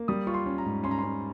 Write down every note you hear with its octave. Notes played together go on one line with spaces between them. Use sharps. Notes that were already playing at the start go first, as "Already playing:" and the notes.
Already playing: A#3
G3 D#6
F4 C#6
C6
C#4
A#5
G#2
C#4 C6
A#5
C#4 C6